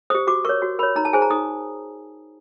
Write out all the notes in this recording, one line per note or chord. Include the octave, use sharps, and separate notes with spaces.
G4 C5 D#6
F#4 D6
A#4 C#5 C#6
F#4
A#4 C#5 B5
D#4 A#5
A5
G#4 C5 G#5
A#5
D#4 D#6